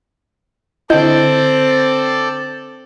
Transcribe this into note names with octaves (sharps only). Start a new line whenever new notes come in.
D3 C4 E4 A4 D5 D#5 G6